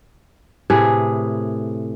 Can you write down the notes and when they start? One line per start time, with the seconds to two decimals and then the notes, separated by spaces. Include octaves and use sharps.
0.70 A2 C3 G#4 B4